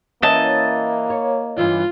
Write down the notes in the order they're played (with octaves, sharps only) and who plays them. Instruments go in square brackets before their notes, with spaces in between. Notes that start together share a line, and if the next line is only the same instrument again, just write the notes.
[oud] E3 C#4 E4 [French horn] A#3 [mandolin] D#5 A5
[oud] C#5
[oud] G2 E3 D5 [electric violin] F4